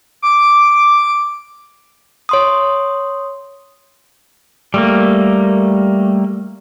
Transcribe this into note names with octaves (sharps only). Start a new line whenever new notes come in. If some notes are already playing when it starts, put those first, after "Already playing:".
D6
C#5 C6 D#6
G3 A3 A#3